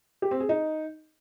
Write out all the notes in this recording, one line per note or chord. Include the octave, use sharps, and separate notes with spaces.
G4
C4
G#4
D#4